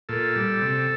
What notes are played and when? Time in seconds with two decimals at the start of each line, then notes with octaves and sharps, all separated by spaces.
0.09 A#2 A4
0.35 G3
0.61 C3